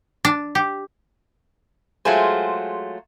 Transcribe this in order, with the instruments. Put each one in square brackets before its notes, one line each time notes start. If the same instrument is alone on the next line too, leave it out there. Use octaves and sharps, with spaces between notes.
[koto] D4
G4
[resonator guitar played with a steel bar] F#3 G#3 A3 F4 G#4 C5